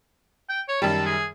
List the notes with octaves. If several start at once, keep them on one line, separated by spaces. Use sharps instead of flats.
G5
C#5
F#2 D#3 G3 A5
G#4